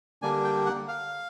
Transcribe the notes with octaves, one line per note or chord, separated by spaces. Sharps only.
D3 G3 A#3 D4 G#5
G5
F#5
F5